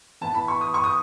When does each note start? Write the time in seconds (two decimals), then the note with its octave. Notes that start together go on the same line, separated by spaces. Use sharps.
0.21 E3 B3 A5
0.34 B5
0.48 C#6
0.61 D#6
0.74 C#6
0.84 D#6